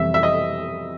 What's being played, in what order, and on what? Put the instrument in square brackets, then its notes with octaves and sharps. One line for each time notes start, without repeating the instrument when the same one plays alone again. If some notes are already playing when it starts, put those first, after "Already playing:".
Already playing: [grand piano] F2 C3 E3 G3 [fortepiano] E5
[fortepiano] E5
D#5